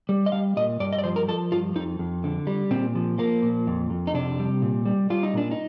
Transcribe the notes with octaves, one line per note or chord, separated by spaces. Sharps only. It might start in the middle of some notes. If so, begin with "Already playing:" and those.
G3
D#5
G3 F5
A#2 D#5
G2 D5
D#5
D5
F3 C5
A#4
F3 A4
G2 F4
F2 D#4
F2
D3
G3
A#2 C4
F3
F3 A#3
A#2
F2
F2
D#4
C3 D4
G3
A#2
G3
G3 F4
D#4
A#2 D4
D#4